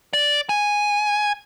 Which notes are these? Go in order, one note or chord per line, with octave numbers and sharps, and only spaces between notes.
D5
G#5